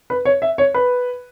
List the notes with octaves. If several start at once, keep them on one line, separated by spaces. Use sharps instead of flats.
B4
C#5
E5
C#5
B4